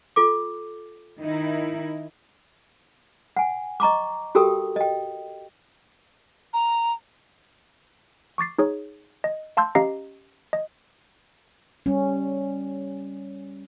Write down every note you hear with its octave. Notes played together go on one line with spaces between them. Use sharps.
F4 A4 D6
D#3 D#4 E4
F#5 G#5
D#5 A#5 C#6 D6
F#4 G4 A4 A#4 G5 D#6
D#5 G5
A#5
C#6 D6 A6 C7
D#4 G#4 C#5
D#5
F5 A5 C6 E6 G6
C#4 G4 D#5 F5 A#5 C7
D#5
G3 C#4